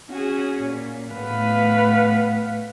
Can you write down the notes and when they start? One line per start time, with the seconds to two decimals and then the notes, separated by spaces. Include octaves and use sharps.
0.11 C#4 F#4 G#4
0.61 A#2
1.14 A2 A3 B3 B4 F5